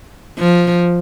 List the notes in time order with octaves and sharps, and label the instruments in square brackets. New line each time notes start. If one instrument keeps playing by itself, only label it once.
[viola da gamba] F3